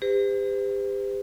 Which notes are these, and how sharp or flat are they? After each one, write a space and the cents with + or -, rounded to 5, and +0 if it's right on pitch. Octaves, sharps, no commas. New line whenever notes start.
G4 +35 C5 -45